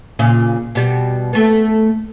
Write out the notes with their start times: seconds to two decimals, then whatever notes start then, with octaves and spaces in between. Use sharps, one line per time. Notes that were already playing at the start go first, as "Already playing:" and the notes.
0.19 A#2 C#3
0.75 B2 G3
1.33 A3 B3